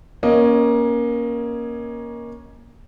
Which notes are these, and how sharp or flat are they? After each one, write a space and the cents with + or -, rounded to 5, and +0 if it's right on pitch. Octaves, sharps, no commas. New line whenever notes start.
A#3 +20 C#4 +0 D#5 +0